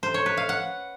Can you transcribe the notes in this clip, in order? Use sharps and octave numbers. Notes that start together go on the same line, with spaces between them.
C5
C#5
B4
F5
F#5